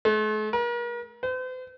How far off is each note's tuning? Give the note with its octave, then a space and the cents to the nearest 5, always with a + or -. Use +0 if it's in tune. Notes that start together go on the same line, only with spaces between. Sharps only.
A3 -45
A#4 +40
C5 -45